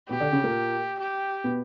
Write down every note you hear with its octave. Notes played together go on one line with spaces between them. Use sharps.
B2 B3 G4
D3 D4
C#3 C#4
A#2 A#3
G4
B2 B3